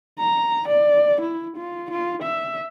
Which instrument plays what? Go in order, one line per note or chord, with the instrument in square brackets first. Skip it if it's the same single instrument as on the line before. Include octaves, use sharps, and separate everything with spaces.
[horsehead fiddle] A#5
D5
E4
F4
F4
E5